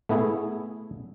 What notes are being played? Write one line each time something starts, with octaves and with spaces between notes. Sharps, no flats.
A3 B3 E4 G#4